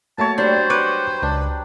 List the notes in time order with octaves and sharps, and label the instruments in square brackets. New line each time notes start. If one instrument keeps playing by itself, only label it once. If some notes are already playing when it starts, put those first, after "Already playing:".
[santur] F#3 C#5 [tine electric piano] A3 A#3 [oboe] A5
[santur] F#3 G3 [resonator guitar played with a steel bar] D4 [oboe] C5
[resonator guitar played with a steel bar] B4 [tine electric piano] C#6 D6 F#6
[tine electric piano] C#2 D5 [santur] D4